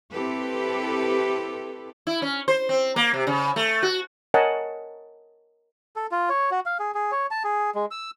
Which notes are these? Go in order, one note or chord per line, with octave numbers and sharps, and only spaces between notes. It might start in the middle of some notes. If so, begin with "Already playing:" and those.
C4 E4 G4 A4 B4
E4
C#4
C5
C4
A#3
C3
C#3
A3
F#4
A#4 C#5 D#5 F#5 G#5 A5
A4
F4
C#5
F#4
F5
G#4
G#4
C#5
A5
G#4
G#3
E6